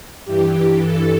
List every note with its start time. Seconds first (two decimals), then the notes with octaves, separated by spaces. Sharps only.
0.25 G2 E3 G4
0.79 A4